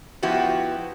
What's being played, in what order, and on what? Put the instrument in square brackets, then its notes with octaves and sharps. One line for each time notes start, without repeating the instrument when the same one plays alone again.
[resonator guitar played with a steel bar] F3 B3 E4 F#4 G4